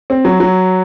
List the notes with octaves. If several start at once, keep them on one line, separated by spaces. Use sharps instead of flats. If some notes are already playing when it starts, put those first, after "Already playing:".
C4
F#3
F#3